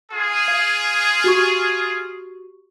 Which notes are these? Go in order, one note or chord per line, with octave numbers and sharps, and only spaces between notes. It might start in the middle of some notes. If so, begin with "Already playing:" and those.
F4 G#4
F5
F#4 G4 C#6